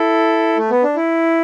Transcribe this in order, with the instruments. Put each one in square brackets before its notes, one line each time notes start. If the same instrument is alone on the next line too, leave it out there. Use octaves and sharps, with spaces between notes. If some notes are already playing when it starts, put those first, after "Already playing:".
Already playing: [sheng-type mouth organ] E4 A4
A3
B3
D4
E4